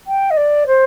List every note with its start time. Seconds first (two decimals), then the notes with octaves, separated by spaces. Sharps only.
0.07 G5
0.30 D#5
0.37 D5
0.67 C5